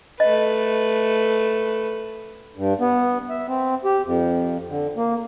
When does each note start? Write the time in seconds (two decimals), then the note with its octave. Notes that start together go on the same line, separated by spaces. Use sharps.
0.20 A3 B4 D#5
2.56 G2
2.80 B3
3.30 E5
3.48 C4
3.85 G4
4.05 F2
4.70 D3
4.97 A#3